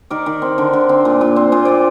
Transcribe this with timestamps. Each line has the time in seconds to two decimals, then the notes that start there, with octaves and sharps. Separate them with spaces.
0.10 D#3 A#4 D5
0.26 D#3
0.42 C4
0.58 D3
0.73 D3
0.89 C4
1.05 A#2
1.21 A#2
1.36 C4
1.52 A#2 C5
1.65 A#2 D5